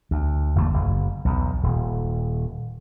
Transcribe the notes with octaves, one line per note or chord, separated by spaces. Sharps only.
D2
G1 E2 A3 A#3
F#1
B1 E2
D#1